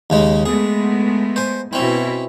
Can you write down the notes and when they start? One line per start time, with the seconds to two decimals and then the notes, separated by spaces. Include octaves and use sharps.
0.10 D#2 C#3 G#3
0.46 G#3 A3 B3 G#4
1.36 C5 G#5
1.73 B2 C4 C#4 E4